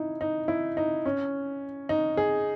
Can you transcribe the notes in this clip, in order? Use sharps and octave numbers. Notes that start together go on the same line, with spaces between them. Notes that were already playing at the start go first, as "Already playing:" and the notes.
Already playing: D#4 E4
D#4
E4
D#4
C#4
D#4
G#4